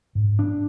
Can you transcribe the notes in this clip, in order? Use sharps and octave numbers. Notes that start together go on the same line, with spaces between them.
G#2
D4